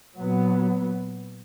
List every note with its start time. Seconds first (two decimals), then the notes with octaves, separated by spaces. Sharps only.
0.15 A#2 F#3 B3